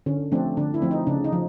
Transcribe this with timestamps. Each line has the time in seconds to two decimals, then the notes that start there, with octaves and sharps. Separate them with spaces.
0.06 D3 C#4
0.32 F3 A3 C4 D4
0.57 D3 D4
0.74 E4
0.82 F3 A3 C4
0.91 D#4
1.07 C#3 D4
1.24 D#4
1.32 F3